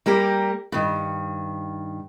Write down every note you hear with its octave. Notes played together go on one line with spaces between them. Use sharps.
G3 A#3 G4 A#4
G2 D#3